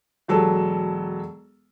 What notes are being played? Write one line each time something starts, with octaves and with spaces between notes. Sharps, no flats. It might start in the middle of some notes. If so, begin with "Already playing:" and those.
E1 F#3 A4 A5